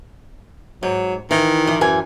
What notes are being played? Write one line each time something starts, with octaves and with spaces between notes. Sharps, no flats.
G#2 F#3
D#3 E3
E3
F#2 E3 G#5